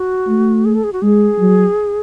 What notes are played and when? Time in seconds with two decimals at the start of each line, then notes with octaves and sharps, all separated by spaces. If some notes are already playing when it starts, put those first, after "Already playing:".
Already playing: F#4
0.28 A3
0.65 G#4
0.74 A4
0.84 G#4
0.93 F#4
1.02 G#3 G#4
1.39 F#3